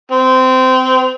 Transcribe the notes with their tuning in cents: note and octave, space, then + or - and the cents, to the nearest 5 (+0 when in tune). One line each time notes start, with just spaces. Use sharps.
C4 -20